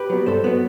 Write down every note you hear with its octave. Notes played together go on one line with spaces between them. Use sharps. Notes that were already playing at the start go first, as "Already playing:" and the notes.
Already playing: G4 B4
F#3 B3
G2 A4 C5
F#3 B3